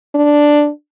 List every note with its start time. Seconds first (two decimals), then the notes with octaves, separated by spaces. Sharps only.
0.15 D4